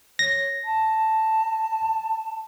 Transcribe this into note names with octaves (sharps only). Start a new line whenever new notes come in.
C#5 A#6
A5